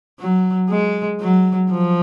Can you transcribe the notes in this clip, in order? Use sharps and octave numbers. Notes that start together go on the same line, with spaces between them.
F#3
G#3
F#3
F3